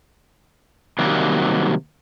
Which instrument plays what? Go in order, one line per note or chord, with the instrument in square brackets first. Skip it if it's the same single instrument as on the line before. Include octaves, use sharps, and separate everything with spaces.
[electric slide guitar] C3 D#3 F#3 G3 A#3